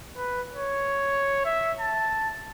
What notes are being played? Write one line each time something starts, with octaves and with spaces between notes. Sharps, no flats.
B4
C#5
E5
A5